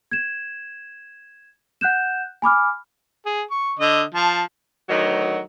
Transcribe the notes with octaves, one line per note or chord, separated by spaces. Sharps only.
G#6 E7
F#5 F#6 G6 E7
G#5 B5 D6 F6
G#4
C#6
D3 D#5
F3 A5
D2 D#3 F#3